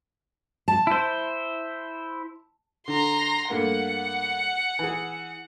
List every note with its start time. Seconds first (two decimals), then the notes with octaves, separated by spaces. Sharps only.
0.68 A5
0.87 E4 C5
2.88 D3 A#5 C6
3.50 G2 A3 A#3 F#5
4.79 E3 G#4